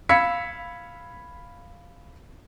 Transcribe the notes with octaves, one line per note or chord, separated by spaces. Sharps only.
F5 B5 E6 G#6 B6 C#7